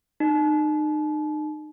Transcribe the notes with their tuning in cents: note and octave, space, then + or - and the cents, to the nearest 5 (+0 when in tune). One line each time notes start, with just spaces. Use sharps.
D#4 -35